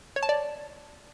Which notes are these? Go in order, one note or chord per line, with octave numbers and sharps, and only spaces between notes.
C#5
A5
D5